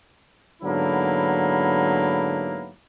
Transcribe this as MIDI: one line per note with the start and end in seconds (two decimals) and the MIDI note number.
0.63 2.69 44
0.63 2.69 50
0.63 2.69 54
0.63 2.69 58
0.63 2.69 59
0.63 2.69 64